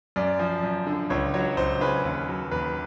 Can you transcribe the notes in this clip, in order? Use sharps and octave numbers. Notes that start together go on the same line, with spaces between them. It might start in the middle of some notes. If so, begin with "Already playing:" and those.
F#2 D5
F3
F#2
D3
C#2 C#5
F#3 C#5
C#2 C5
C#3 B4
D#2
F#3
D#2 B4